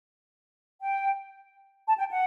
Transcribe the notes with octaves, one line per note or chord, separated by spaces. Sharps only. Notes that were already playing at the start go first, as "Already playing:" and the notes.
G5
A5
G5
F#5